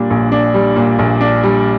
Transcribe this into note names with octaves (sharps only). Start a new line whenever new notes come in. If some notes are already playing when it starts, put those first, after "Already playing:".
Already playing: A#2 G3 D4
A#1
D4
G3
A#2
A#1
D4
G3